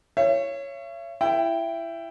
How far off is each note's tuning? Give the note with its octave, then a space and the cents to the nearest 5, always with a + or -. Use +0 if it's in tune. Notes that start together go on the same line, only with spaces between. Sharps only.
C#5 +0 E5 +45
E4 +20 G5 +0